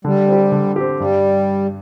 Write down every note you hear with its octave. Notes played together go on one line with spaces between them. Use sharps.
D3 G3
C4 G4
D3
C4 G4
G2 G3